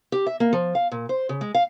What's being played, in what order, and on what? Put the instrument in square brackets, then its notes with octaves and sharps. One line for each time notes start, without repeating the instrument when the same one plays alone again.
[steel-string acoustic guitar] G4
E5
A#3
F3
F5
A#2
C5
C#3
G#3
F5